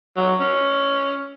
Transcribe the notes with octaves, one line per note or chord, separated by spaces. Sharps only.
F#3
C#4